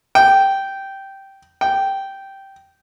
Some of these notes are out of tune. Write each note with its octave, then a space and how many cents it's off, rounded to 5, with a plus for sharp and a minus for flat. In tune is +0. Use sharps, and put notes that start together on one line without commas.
G5 -10
G5 -10